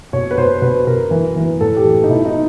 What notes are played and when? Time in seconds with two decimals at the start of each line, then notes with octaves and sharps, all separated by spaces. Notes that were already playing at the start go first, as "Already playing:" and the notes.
0.13 B2 C#5
0.31 B4
0.37 B2 C5
0.62 B2 B4
0.87 B2 A#4
1.11 E3
1.36 E3
1.61 A2 A4
1.76 G4
1.85 E3
2.03 D#4
2.09 B2 E4
2.25 D#4